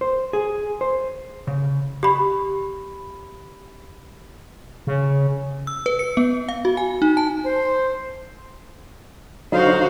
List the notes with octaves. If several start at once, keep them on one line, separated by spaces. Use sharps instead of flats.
C5
G#4
C5
C#3
G4 B5
C#3
E6
B4
C#7
B3
F5
F#4
G#5
D#4
A5
C5
D3 F#3 D#4 F#4 C5 F5